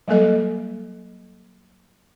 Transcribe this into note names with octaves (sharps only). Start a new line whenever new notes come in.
F#3 G3 A#3 A4 D#5